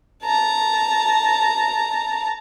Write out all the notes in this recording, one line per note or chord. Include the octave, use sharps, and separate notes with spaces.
A5 A#5